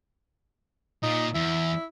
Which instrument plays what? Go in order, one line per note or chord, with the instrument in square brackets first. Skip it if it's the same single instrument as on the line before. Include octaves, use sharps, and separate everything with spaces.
[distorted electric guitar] A#2 [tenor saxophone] D#4
[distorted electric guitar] E2 [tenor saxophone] E4